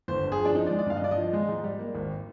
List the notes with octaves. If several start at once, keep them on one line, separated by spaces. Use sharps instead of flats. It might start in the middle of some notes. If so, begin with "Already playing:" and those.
G1 C5
G2
G#4
F3
D4
F3 D#4
D5
G#3
D5
G2 F5
D#5
G2 D5
D#5
F3
G#3
G#2
G3
A#3
G#1